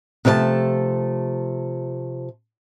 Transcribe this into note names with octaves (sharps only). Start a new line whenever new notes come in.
C3 F3 A3 C#5 A5